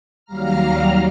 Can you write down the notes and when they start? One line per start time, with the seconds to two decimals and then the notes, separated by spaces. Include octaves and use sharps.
0.25 D#2 F#3 G3 F5 A#5 F6